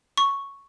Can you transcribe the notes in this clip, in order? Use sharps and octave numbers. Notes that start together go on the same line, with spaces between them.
C#6